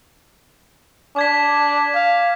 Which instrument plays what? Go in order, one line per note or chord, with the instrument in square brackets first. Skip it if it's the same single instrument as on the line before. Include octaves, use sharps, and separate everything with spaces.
[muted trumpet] D4 [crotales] D6 G#6 B6
[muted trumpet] F5